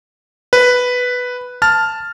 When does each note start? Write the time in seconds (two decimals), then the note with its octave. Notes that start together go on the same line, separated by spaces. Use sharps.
0.53 B4
1.62 A5 F6 A6